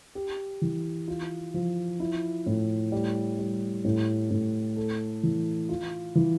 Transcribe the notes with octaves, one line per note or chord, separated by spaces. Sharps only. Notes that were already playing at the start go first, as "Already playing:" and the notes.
G4
E3
F4
F3
E4
A2
G3
G3
A2
A2
A4
E3
F4
E3